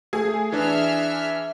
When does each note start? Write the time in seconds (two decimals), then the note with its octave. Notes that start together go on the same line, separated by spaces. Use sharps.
0.13 A3 G#4
0.52 E3 D4 E5 F6